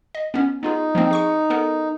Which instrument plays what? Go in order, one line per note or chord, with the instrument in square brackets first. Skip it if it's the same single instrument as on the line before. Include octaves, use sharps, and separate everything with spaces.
[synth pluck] D#5
B3 C#4
[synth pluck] B3 F4 G#4 [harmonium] D#4
[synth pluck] F3 A#3 C4
G#4 C#6 C#7
B3 A4 A#4